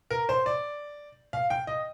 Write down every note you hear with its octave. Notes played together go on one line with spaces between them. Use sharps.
A#4
C5
D5
F5
G5
D#5